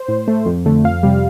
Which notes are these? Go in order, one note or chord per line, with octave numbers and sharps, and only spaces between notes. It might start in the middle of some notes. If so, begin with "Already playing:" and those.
Already playing: C5
A2
A3
F2
D3 A3
F2 F5
C3 G3